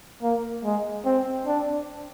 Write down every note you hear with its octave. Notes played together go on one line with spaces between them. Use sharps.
A#3
G#3
C4
D4